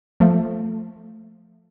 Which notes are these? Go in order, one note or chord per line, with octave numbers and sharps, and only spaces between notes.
F3 A3